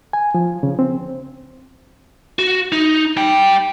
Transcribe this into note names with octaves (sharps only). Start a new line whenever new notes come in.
G#5
F3
C#3
C4
F#4
D#4
G3 G5